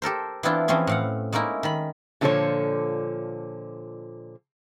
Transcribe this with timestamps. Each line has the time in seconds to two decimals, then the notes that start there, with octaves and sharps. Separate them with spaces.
0.02 G4 A4 A#4 C5
0.43 E3 B3 C4 D4 E4 F4
0.68 E3 F3 C4 C#4 G#4
0.87 A2 F5 F#5
1.32 G#3 A#3 C#4 D#4 E4
1.63 D#3 B5
2.21 A#2 D3 F3 A4 C5 C#5